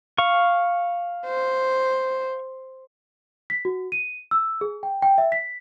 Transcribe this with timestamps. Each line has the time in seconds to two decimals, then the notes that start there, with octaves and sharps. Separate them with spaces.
0.18 F5 C#6
1.26 C5
3.50 B6
3.65 F#4
3.92 D#7
4.31 E6
4.61 G#4
4.83 G5
5.02 G5
5.18 E5
5.32 B6